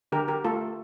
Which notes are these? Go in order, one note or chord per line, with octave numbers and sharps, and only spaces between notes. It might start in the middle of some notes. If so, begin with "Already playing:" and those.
D3 G4 A#4
G4 A#4
A3 F4 A4